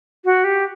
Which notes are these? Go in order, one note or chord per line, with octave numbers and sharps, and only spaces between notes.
F#4
G4